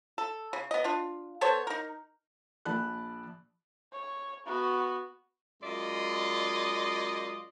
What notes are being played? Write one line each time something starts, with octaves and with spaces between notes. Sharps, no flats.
A4
C#3
B3 D#5
D4 F4
B3 A4 C5 C#5
D#4 A#4
A#1 D5 A5 B5 F#6
C#5
B3 F#4
F#2 G#3 F4 D5 D#5 C6